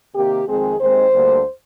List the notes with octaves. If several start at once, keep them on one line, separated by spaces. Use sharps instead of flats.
C3 D#3 A#3 G4
F2 D#3 G#3 C4 G#4
D#2 D#3 G#3 C4 C5
D2 D3 G3 A#3